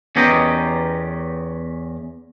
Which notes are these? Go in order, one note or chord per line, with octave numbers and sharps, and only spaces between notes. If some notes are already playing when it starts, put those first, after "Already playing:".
E2 B3 C#4 G4 A#4 D#5